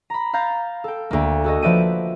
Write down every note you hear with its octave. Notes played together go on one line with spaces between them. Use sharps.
A#5 B5
F5 A#5 G6 A6
A4 G5
D2 A#3
F#4 A4 D#5
F3 B4 D5 E5 G5 D#7